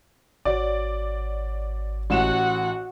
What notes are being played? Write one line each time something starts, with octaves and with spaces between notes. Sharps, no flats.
G#1 F#4 C#5 D5
A1 A2 F#4 F#5 E7